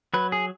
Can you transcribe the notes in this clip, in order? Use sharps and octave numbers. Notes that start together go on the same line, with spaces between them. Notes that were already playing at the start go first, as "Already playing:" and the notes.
F#3 B4
G#4